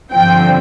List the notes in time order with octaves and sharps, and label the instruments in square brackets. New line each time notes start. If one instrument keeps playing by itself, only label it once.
[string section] G2 D3 F3 C4 G5